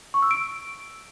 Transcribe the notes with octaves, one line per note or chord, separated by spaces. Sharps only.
C#6
E6
D7